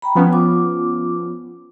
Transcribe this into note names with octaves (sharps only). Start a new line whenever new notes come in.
G5 A#5 B5
F3 B3 C#4 F#5 G5
F4 D6